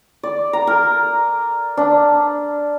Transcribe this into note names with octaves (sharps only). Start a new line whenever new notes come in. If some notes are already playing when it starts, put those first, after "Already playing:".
D5
A#5
A#4
D4